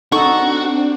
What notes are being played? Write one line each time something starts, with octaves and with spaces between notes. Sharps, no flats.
C4 D4 D#4 F#4 A4 C#6